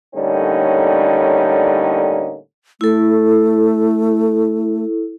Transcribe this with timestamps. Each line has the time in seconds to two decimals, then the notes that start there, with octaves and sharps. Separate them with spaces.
0.15 A2 D3 G3 A#3 C#4 D#4
2.81 A3 E4 A4